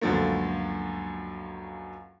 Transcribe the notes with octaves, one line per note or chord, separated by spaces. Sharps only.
C#2 F#2 D3 F3 A3 A#3